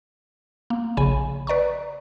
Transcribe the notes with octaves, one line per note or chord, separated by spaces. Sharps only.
A#3
A#1 C#3 G#5 B5 D#7
B4 D5 A#5 C#6